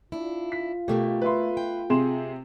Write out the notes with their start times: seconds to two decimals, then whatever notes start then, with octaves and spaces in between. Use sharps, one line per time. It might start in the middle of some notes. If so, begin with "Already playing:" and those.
0.12 D4 E4 F4
0.52 B6
0.88 B2 A3 A#3 G4
1.21 B4 E5 C6
1.57 G5
1.90 C3 G#4 C6 E7